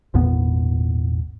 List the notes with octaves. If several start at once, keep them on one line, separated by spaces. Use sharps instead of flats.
G#1 E2 A#2 B3